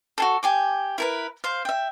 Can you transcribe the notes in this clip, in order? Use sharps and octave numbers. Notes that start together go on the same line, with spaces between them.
F#4 G#4 A4
G4 G#5 D6
E4 A#4 B4
C5 F5
E5 G5